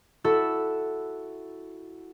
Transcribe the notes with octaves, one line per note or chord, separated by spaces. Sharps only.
E4 F#4 A4 E5